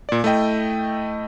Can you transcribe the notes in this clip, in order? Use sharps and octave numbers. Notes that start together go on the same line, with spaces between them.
A#2 D5
A3 E4 D#5 G5